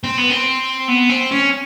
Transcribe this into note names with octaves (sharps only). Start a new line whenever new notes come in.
C4
B3
C4
B3
C4
C#4